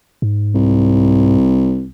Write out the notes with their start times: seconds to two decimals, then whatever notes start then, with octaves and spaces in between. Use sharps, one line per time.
0.22 G#2
0.54 C2